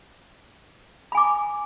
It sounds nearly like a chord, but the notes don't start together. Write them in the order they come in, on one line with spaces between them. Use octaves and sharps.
B5 G#5 D6